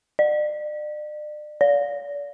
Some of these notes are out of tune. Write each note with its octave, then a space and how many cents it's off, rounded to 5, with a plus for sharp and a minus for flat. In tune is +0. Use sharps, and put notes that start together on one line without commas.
D5 +40
D5 -35